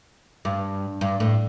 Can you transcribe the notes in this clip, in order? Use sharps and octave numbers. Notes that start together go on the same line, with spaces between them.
G2
G2
A2